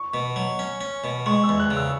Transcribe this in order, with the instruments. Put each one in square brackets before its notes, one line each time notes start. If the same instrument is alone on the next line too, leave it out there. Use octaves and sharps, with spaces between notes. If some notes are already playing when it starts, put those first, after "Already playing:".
Already playing: [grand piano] C#6
[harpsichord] B2
F#3
C#4
C#4
B2
[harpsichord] G#3 [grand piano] C#6
[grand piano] E6
[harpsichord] E2
[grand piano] F#6
[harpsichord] C#3
[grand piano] E6